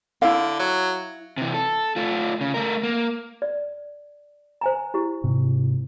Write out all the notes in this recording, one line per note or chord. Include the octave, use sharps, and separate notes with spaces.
D3 E4 F5
F#3
C3 E3
A4
A3 F4
C#3
A3 A#4
A#3
D5
C5 G#5 A#5
E4 G4
G#2 C3